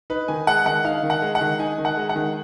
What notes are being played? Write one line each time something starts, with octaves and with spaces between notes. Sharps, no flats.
D#4 B4
D#3 G#5
G#3 F#5
D#3 F#5
D#4 F5
D#3
F#5
G#3
F#5
D#3
D#4 G#5
D#3
F#5
G#3
F#5
D#3